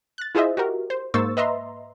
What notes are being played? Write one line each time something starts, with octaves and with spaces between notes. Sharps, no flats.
F#6 A6
E4 F4 G#4 C5 D#5 E5
F#4 G4 A#4
C5
G#2 A#3 C5 C#6 E6 A6
B4 D#5 E5 A#5 C6